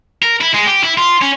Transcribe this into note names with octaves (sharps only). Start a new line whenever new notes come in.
A#4
E4
G#3
G4
E4
F4
C#4